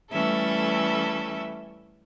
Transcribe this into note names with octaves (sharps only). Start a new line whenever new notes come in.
E3 G3 A3 C#4 A4 E5